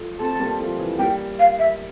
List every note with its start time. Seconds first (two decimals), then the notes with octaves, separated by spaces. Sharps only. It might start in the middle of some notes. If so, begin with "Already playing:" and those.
Already playing: F3 A3
0.19 A3 C4 A5
0.39 G3 A#3
0.59 F3 A3
0.79 E3
0.99 G3 A#3 G5
1.39 F5
1.59 E5